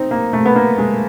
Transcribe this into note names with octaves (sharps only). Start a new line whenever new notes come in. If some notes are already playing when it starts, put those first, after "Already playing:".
Already playing: C4 D#4
A#3
A3
B3
A#3
G#3